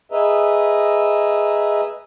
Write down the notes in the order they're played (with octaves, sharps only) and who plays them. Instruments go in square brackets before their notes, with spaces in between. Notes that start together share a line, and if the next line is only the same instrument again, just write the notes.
[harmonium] G#4 B4 D#5 E5 A#5